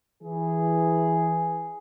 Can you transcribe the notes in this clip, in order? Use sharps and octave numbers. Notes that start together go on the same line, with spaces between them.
E3 G#4